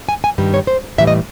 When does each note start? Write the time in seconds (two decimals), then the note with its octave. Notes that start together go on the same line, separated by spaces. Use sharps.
0.09 G#5
0.24 G#5
0.38 G2 D#3 G3
0.54 C#5
0.67 C5
0.98 A2 E3 G3 E5
1.07 D#5